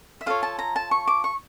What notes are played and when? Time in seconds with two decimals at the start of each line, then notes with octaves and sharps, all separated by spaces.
0.21 E5
0.26 F4 A4 C#5 F5
0.43 A5
0.59 A#5
0.76 A5
0.91 C#6
1.07 D6
1.24 C#6